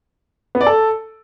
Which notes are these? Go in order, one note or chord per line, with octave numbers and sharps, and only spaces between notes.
B3
D5
A4